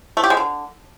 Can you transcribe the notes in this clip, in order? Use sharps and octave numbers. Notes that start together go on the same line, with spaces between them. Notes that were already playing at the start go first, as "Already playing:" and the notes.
A3
G4
G#3
D3